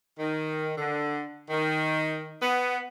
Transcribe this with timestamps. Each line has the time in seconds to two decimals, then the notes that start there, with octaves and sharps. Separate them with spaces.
0.19 D#3
0.78 D3
1.50 D#3
2.41 B3